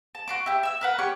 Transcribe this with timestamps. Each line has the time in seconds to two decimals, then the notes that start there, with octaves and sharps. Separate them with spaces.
0.15 A5
0.28 F#4 C6 D6
0.46 E4 G4
0.63 E5 E6
0.81 A#4 B4 F#5
0.98 C#4 G4 C#6 F#6